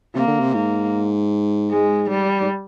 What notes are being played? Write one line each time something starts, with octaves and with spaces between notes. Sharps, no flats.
C3 A#3
D3
C3
G#2 A#3
G#3
G3
G#2